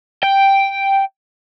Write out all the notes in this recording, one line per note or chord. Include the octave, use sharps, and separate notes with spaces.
G5